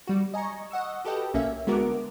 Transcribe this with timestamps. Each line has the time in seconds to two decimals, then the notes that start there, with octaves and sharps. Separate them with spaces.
0.07 G3 F#4
0.34 D#5 G#5 A#5 C#6
0.71 D#5 F#5 C#6 E6
1.05 F#4 G4 A4 B4 D#5 G5
1.34 B1 A#3 C#4 E5
1.67 D3 G#3 B3 F#4 A#4 D6